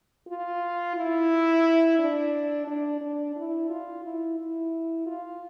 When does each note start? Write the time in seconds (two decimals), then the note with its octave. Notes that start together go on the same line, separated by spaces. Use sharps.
0.28 F4
0.96 E4
1.99 D4
2.67 D4
3.01 D4
3.36 E4
3.70 F4
4.04 E4
4.38 E4
5.06 F4